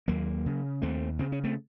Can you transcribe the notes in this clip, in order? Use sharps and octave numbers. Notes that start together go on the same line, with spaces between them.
D#2 F#3 A#3
C#3
D#2 A3 C4
C#3 C4
C#4
A3 C4